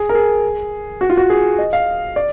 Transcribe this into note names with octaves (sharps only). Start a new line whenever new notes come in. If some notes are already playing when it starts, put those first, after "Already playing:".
Already playing: G#4
A#4
G#4
F#4
F4
F#4
G#4
D#5
F5
D5